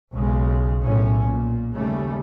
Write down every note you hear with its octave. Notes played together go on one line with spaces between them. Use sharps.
B1 C#3 G#3
B1 A2 C#4
A#2
D#2 C#3 G3 A3